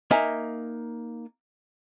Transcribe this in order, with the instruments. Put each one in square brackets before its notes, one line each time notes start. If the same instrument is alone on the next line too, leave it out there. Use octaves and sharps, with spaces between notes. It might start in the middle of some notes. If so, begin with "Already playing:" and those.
[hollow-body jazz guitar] A#3 D#4 E5 G#5